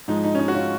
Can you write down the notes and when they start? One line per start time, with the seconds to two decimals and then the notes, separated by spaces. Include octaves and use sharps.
0.08 G#2 F3 G#3 D#4
0.24 D#4
0.35 C#4
0.40 D#4
0.48 F#4
0.55 C#4 F4